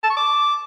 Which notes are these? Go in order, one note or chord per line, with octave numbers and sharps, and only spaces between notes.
A5
C#6
D6